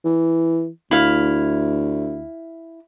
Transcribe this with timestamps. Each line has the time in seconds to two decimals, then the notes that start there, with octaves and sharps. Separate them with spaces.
0.05 E3
0.91 D2 E4 F5